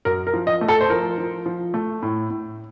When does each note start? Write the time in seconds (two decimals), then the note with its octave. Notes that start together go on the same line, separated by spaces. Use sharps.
0.05 F#2 A#4
0.27 A#4
0.33 F3
0.47 D#5
0.61 A3
0.68 A4
0.81 C5
0.90 F3 A#4
1.18 F3
1.46 F3
1.74 A3
2.02 A2
2.30 A2